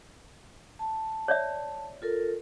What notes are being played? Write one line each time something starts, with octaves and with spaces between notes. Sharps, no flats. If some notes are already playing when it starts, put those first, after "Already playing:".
A5
C#5 D5 E5
F4 A4 A#4